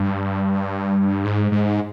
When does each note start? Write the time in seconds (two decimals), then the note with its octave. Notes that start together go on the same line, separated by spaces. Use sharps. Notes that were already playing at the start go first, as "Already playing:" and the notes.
Already playing: G2
1.25 G#2
1.52 G#2